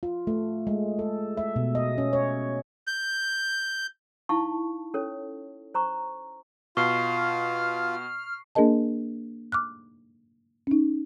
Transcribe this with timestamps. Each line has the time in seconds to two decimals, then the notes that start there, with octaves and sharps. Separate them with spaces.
0.03 F4
0.27 A3
0.67 G#3
0.99 A4
1.37 E5
1.56 B2
1.75 D#5
1.98 C#4
2.13 C#5
2.87 G6
4.29 D#4 E4 F5 A5 C#6
4.94 C#4 A4 C#5
5.74 C5 A#5 C#6
6.77 B2 F4 C#6 F6 C7
8.55 A#3 D4 G#4 A#4 D#5 A5
9.52 D6 F6 F#6
10.67 C#4 D#4